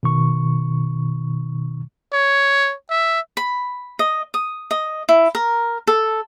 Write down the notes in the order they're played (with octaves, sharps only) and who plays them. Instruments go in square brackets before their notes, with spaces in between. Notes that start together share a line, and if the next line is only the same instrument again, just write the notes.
[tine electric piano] B2 D#3 C#6
[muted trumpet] C#5
E5
[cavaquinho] B5
D#5
D#6
D#5
E4
A#4
A4